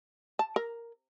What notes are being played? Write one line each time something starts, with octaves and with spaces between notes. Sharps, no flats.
A5
A#4